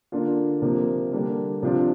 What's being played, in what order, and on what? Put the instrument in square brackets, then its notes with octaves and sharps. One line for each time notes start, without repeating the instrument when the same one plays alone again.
[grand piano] D3 A#3 D4 F4
C3 F3 A#3
D3 G3 A#3 D4
C3 F3 D4 F4